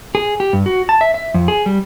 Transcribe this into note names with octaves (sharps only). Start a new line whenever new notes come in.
G#4
G4
G2
F#4
A5
E5
E5
F2
G#4
G3